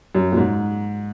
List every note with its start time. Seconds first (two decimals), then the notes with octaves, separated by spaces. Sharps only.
0.15 F#2
0.32 A#2
0.37 G#2